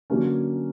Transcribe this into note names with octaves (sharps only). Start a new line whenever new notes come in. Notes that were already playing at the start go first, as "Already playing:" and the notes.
D3 F#3 A#3 C#4